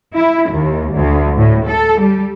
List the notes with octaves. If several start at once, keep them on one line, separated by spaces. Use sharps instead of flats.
E4
D#2
D2
A2
A4
G3